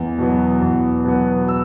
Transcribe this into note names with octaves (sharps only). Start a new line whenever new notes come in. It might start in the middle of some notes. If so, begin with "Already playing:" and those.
Already playing: E2
B2 F#3 B3
E2
B2 F#3 B3
E6